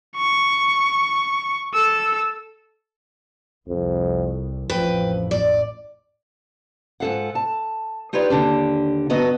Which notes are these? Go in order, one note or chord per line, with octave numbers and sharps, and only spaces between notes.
C#6
A4 E6
C2 F2
A1 F2 F3 B4 G5
D5
G#2 F4 A4 F5 F#5
A5
D#4 F4 G4 B4 C#5 D5
D#2 D3 D4 G4
G2 D3 B3 F#4 D#5 A#5